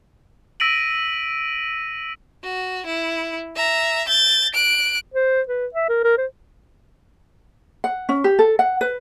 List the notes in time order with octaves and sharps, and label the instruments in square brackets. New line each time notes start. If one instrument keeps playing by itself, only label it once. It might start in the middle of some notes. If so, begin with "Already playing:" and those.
[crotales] E6 A#6 B6 D7 D#7 F#7
[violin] F#4
E4
E5 A#5
G6 A6
F#6 D7
[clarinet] C5
B4
E5
A#4
A#4
C5
[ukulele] F#5
C#4
G4
A4
F#5
B4